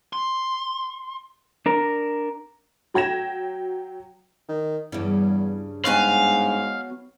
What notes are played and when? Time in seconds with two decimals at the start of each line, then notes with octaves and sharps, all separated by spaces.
0.13 C6
1.66 D4 A#4
2.94 F#3 G5 G#6 A#6 E7
4.49 D#3
4.92 E2 G2 C#3
5.85 G#2 F#3 B3 F5 G#5